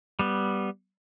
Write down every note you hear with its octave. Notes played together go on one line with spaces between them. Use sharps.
G3 B3